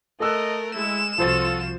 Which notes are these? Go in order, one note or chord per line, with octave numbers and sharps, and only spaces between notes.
A3 A4 A#4 D#5 E6 F#6
G#3 E4 E7
C2 F3 F4 F#4 A4 C5 A6